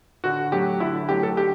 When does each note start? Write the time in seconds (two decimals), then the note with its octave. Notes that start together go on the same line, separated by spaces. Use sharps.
0.24 D3 F#4
0.52 F#3 A3 G4
0.80 D3 E4
1.09 F#3 A3 G4
1.23 A4
1.37 D3 G4